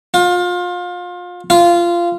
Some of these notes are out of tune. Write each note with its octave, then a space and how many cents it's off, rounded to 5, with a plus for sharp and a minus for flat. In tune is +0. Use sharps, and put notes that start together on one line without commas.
F4 +30
F4 -15